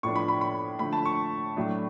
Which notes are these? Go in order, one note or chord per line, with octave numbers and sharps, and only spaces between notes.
A2 F3 B3 D4 C#6
B5
B5
B5
D3 F3 A3 B5
A5
C#6
A2 F#3 A3 D4